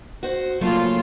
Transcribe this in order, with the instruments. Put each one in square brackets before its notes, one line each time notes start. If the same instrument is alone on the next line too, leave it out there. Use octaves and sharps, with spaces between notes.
[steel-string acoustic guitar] F#4 C5
[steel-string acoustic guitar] C#3 A3 [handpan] F#3 A#3 [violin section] F4